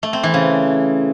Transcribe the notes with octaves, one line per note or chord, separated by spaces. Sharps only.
A3
C4
E3
C#3